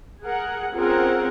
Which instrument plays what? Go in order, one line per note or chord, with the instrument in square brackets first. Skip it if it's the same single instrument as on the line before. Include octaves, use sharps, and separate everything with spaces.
[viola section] G#4 A#4 F#5
C4 C#4 F4 G#4 A#4 F#5